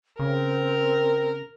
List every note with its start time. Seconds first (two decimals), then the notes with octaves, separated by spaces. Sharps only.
0.19 C#3 C4 A#4